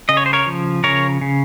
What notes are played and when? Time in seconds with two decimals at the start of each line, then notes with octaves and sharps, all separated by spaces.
0.09 C#3 D#5
0.17 C#5
0.26 C5
0.33 A#4 C#5
0.46 F3
0.84 C#3 A#4 C#5
1.21 C#3